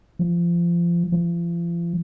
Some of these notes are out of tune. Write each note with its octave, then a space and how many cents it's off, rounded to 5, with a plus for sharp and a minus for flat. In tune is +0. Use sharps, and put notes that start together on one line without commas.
F3 -25
F3 -40